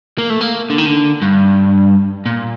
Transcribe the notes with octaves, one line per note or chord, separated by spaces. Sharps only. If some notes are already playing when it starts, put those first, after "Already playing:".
A#3
A3
A#3
D3
D#3
D3
G2
A#2